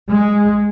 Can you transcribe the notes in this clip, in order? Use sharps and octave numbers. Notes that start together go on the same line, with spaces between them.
G#3